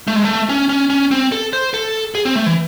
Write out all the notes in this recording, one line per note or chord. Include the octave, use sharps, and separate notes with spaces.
A3
G#3
A3
C#4
C#4
C#4
C4
A4
C5
A4
G#4
C4
A3
E3